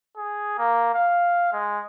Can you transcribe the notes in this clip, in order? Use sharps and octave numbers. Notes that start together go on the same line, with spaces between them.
G#4
A#3
F5
G#3